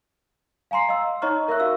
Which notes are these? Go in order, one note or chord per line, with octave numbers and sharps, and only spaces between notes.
F5 G#5 A#5 C6 C7
D#5 F5 C6 E6
D#4 C#5 D#5 A#5 C#6 F6
A#4 E5 C#6 E6 F#6
F#4 E5 F5 E6